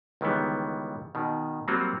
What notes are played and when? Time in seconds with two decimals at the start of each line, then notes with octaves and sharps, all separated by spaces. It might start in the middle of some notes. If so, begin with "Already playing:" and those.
0.21 C#2 D#3 E3 G3 B3
1.15 B2 D#3
1.68 F#3 G3 A#3 C4 F4 F#4